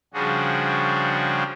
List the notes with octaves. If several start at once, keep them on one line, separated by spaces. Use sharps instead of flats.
C#3 F3 G3 D4 F#4 G#4